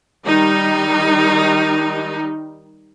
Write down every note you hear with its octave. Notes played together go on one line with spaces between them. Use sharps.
D#3 G3 D#4